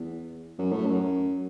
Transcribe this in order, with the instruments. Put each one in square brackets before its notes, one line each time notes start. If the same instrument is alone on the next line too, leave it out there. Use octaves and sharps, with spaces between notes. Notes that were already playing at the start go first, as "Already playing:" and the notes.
Already playing: [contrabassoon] E2
F#2
A2
F#2